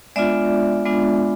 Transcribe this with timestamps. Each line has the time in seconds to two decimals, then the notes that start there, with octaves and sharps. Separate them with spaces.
0.16 G#3 B3 D4 F4 D5 E5
0.85 G#3 B3 D4 F4